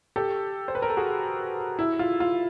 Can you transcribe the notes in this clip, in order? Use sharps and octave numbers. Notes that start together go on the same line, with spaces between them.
G4 A4
C5
B4
A#4
A4
F#4 G#4
E4
F4
F4